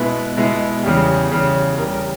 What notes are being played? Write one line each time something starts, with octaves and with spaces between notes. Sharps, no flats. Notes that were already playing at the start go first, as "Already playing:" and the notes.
Already playing: B2 G#3 B3 E4 B4
B2 G#3 B3 E4
E2 C#3 G3
E2 C#3 G3
E2 C#3 G3 A#4
A#4